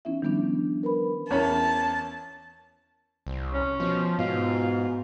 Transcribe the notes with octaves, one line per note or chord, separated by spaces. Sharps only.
E3 B3 C#4 D#4 E4 E5
D#3 F3 G3 B3 C#4 D4
A#4 B4 B5
E2 C#4 A#4 C#5 A5 B5
C2
C#4
B2 F3
G#2 B2 F4